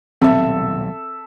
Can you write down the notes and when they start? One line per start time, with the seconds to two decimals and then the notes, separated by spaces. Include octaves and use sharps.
0.22 D#1 B1 C3 C4 A4 E5